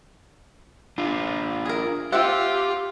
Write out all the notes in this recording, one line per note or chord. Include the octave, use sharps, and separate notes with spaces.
D4 F4
G#4 A#4
C4 F4 G4 E5 F#5